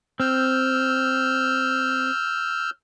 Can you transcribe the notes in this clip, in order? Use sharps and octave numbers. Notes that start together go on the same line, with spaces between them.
C4 E6 F6 G6